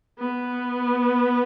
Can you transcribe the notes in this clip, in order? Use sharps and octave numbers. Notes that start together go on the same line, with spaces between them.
B3